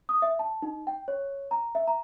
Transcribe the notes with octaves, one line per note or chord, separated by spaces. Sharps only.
D#6
E5
A5
D#4
G5
C#5
A#5
E5
A#5